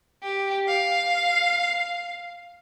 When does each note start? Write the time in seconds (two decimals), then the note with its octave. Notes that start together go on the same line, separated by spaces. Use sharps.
0.23 G4
0.68 F5